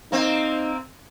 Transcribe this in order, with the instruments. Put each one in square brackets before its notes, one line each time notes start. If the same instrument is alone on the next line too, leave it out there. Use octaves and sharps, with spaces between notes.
[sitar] A#3 C4 [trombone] D#4